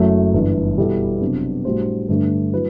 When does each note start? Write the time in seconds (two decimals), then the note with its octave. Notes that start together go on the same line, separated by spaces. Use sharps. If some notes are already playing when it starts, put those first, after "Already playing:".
Already playing: F#1 F#2 F#3 A3 E4
0.34 G1 G2 E3
0.77 B2 G3 B3 E4 A4
1.21 C3 F#3 B3 D4
1.65 A2 G3 D4 F#4 C5
2.09 G2 D3 A3 D4
2.53 F#3 A3 E4 B4